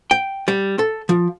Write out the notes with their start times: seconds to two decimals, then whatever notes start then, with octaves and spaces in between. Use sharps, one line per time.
0.11 G5
0.48 G3
0.79 A4
1.09 F3